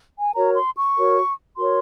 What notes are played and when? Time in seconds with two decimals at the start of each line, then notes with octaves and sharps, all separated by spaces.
0.20 G#5
0.35 F#4 A#4 C#5 A#5
0.56 C6
0.76 C#6
0.97 F#4 A#4 C#5
1.57 F#4 A#4 C#5 C6